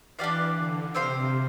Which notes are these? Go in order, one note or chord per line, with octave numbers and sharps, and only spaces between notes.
E3 D4 G4 D5 F5
D3
C3 C4 G4 C5 F5